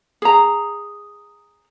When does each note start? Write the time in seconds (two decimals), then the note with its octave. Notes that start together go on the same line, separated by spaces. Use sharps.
0.22 G#4 A#5